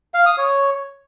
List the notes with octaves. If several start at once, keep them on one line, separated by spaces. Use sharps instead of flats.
F5
D#6
C#5